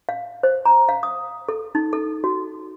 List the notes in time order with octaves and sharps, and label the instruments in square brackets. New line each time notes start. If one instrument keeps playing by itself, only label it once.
[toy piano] F5
C5
A#5
F5
D#6
A4
D#4
A4
F#4